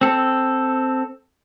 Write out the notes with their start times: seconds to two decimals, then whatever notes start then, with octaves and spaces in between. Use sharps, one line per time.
0.01 C4 A4